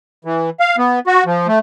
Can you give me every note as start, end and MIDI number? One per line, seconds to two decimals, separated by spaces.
0.25 0.50 52
0.60 0.76 77
0.78 0.99 59
1.07 1.24 66
1.26 1.47 53
1.47 1.59 57